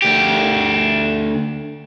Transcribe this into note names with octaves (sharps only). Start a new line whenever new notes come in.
D2 G4